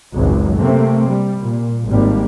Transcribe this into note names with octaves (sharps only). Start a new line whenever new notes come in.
G#1 C#2 F#2 F#3
C3 A3 A#3 C4
G3
A#2
G#1 G3 A#3